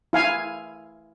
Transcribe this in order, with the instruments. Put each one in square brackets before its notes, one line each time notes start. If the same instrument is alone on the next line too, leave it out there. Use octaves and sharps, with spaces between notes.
[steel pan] E4 F5 G#5